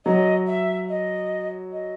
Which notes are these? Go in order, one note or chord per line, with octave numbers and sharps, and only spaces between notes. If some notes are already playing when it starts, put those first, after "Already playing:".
F#3 D#5
E5
D#5
D#5